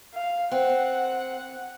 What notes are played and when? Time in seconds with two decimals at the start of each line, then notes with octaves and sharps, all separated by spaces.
0.14 F5
0.51 C4 F#5